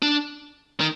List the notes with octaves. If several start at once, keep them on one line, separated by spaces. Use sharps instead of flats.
D4
D#3